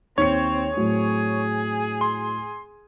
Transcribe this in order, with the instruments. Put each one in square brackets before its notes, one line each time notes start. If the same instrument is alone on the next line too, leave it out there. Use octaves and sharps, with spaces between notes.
[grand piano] D#2 C#7 [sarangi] C4 [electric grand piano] C#5
[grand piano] A2 F#3 [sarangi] G#4
[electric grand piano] C6